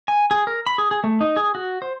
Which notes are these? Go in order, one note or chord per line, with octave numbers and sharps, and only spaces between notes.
G#5
G#4
A#4
B5
G#4
G#4
A3
D#4
G#4
F#4
C5